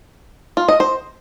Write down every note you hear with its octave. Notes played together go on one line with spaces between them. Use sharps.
F4
D#5
C5